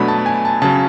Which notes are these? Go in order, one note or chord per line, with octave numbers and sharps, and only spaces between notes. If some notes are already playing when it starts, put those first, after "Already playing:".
Already playing: B2 F#3 A3 D4 B5
A5
G#5
A5
C#3 F#3 C#4 A5